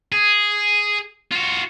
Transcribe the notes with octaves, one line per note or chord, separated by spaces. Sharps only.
G#4
F4 F#4